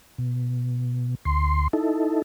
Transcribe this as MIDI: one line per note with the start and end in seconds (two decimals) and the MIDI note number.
0.18 1.15 47
1.25 1.68 38
1.25 1.68 84
1.73 2.22 63
1.73 2.22 64
1.73 2.22 69